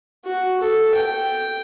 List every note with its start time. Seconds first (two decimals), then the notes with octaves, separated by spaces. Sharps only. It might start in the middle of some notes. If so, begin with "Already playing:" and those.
0.25 F#4
0.61 A4
0.96 G5